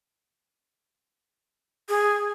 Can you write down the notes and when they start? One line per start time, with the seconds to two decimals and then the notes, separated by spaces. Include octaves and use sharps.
1.89 G#4